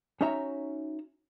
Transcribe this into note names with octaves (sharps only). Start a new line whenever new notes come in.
C#4 D#4 F#4 C#5 E5 A#5